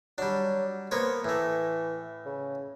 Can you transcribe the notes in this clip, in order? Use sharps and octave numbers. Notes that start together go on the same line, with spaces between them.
F#3 G3 D4
A#3 B3 C5 C#5
A2 E3 A3
C#3